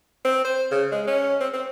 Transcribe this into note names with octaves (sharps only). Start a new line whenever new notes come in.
C4
C5
C#3
G#3
C#4
C4
C4